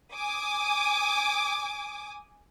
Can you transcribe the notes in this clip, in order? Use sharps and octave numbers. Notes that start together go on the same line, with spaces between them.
G#5 D6 D#6